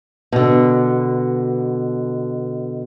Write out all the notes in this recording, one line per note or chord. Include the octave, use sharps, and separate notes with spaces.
B2 D3